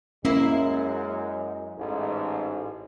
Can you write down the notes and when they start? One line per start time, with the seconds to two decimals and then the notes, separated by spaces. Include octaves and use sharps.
0.25 F#2 G#3 A#3 C#4 E4 F5
1.78 A1 G#2